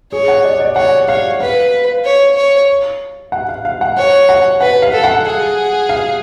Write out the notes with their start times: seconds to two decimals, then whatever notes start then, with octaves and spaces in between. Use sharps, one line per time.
0.12 G#4 C#5
0.28 F#5
0.44 D5
0.60 D5
0.76 C#5 F#5
1.08 C#5 F5
1.40 B4 F5
2.05 C#5
2.36 C#5
3.32 F#5
3.49 F5
3.65 F5
3.81 F#5
3.97 C#5 F#5
4.29 F#5
4.61 B4 F#5
4.82 F5
4.93 A4
5.04 F#5
5.26 G#4
5.89 F5